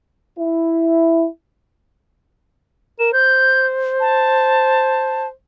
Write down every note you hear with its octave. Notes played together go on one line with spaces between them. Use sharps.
E4
A#4 E7
C5 G6
A5